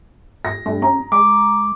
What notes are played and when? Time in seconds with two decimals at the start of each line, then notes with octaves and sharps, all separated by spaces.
0.45 A#6
0.66 G2 A3
0.82 C#4 A#5
1.12 G#3 D6